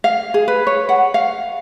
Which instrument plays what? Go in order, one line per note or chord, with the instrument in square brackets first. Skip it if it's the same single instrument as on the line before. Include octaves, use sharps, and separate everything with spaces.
[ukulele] F5
G#4
B4
C#5
F#5
F5